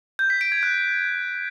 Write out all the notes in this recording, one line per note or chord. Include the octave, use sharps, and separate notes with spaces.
G6
B6
D7
G#6
F#6